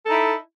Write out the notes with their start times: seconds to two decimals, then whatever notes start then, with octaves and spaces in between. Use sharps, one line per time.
0.05 A4
0.07 D#4
0.10 E4